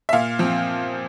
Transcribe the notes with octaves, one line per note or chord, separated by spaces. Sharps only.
E5
A#2 F5
F3 C4